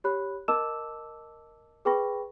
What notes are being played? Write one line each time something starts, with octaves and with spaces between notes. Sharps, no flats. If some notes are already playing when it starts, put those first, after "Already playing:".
G4 C#5 B5 F#6
A#4 D#5 A5 D6 E6 E7
G#4 B4 G5 B5 C#6 A#6